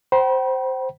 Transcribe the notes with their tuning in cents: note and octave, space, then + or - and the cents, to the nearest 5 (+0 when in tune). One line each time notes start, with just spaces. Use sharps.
C5 +0 G5 -40 B5 -35